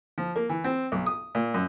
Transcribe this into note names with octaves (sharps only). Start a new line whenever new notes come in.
F3
A#3
E3
C4
B1
D#6
A#2
F#2